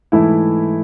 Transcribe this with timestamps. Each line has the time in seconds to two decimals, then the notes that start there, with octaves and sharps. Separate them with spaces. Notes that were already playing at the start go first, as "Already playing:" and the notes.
0.12 G#2 E3 A3 E4